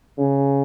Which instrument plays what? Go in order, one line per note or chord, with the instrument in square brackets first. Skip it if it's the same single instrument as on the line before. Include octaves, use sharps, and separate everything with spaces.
[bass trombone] C#3